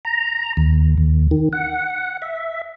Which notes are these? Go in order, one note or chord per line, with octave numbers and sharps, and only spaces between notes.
A#5
D#2
D#2
D#3
F#5
E5